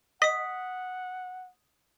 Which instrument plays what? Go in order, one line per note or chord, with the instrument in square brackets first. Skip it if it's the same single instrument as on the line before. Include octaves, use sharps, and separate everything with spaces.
[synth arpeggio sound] D#5 [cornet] F#5 [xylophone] D#6 B6